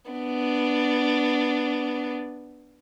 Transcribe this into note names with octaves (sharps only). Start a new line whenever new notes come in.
B3 D4